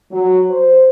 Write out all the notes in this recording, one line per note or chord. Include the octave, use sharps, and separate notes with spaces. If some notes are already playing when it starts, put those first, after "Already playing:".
F#3
C5